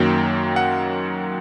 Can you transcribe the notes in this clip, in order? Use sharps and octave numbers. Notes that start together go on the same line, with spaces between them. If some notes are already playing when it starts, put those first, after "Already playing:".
Already playing: F#2 D#3 F#3 A#3 G5
F#5